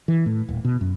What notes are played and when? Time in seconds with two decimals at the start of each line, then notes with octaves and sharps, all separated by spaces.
0.08 E3
0.26 A2
0.49 D#1
0.65 B2
0.81 F#2